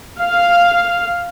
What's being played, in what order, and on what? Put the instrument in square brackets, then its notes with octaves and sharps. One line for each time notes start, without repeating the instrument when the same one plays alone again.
[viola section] F5